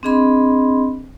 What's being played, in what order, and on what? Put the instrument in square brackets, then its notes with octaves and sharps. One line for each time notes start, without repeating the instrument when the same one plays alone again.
[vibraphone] C4 D4 G#4 D#5 B5 C6